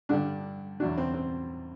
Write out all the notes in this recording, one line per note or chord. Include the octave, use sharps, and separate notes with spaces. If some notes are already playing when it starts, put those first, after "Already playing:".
G2 D3 G3 D4
E2 B2 F#3 D4
C4
C4